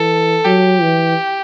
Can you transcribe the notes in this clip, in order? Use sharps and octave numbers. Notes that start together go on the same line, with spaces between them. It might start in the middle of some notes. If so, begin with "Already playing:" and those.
Already playing: E3 A4
F#3 G4
E3